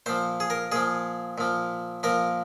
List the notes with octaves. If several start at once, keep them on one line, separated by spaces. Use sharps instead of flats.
A#2 F3 C5
G#4
A#4
A#2 F3 G#4
A#2 F3
A#2 F3 A#4